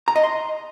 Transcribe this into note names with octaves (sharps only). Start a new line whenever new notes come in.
A#5
D#5
C6